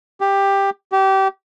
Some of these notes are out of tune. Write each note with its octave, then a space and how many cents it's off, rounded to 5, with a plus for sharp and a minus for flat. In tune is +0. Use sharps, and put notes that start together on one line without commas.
G4 +10
G4 -25